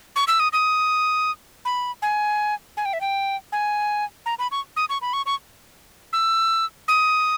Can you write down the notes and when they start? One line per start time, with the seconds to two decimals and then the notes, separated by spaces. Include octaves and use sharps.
0.16 C#6
0.28 E6
0.40 D#6
0.53 D#6
1.65 B5
2.02 G#5
2.77 G#5
2.85 G5
2.93 E5
3.01 G5
3.52 G#5
4.26 A#5
4.39 B5
4.51 C#6
4.76 D#6
4.89 C#6
5.02 B5
5.13 C#6
5.26 C#6
6.13 E6
6.88 D#6